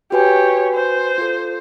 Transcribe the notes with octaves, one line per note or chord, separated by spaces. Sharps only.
F#4 G4 B4 C#5 G#5
C5
F4 A4